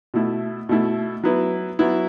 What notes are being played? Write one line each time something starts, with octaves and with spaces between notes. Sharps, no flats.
B2 A3 E4
B2 A3 E4
F#3 B3 E4
F#3 B3 E4